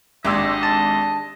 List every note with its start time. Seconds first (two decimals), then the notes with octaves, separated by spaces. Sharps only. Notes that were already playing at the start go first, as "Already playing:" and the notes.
0.25 G#1 G#3 D4 G4 D#5 E6
0.63 A5